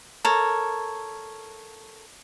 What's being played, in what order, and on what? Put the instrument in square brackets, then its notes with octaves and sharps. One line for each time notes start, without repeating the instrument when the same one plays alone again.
[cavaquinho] A4 A#4 C#5